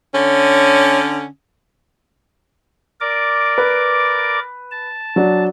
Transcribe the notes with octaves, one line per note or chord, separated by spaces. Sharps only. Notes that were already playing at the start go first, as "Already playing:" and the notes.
D3 C#4
A#4 D5 D6
B4
A5
F#3 D4